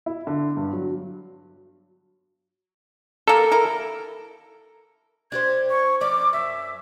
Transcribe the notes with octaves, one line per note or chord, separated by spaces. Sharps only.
E4
D3
G2
F#3
A#3 A4 A#4
E4 A#4
D4 G4 C5 G#6
C#6
F3 C#4 D5 D6
F#2 E5